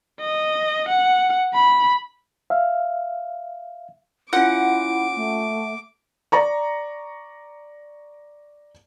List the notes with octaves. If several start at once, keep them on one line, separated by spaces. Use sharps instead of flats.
D#5
F#5
B5
E5 F5
C#4 E4 F4 F#5 D6
A3
D5 A#5 C#6